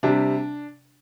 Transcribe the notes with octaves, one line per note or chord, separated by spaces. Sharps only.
C3 G3 D4